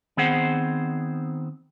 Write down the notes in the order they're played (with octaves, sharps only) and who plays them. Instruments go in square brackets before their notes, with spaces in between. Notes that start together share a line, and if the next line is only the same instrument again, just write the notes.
[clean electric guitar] D#3 B3 C4 G#4 C5 F#5